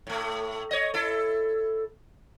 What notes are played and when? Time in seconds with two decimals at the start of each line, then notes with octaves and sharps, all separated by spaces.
0.07 A2 A3
0.71 C#5 D#5
0.94 E4 A4